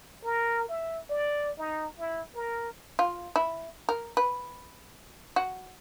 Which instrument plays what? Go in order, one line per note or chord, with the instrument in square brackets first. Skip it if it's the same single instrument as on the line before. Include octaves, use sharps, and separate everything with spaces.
[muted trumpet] A#4
E5
D5
D#4
E4
A#4
[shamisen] F4
E4
A#4
B4
F#4